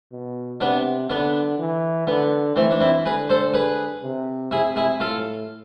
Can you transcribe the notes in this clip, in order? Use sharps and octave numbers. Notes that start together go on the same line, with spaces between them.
B2
C3 B3 D4
D3 B3 D4
E3
D3 B3
E3 A3 C4
D4
C4 E4
D3 G#4 B4
A4 C5
G#4 B4
C3
C3 E4 G#4
E4 G#4
A2 F4 A4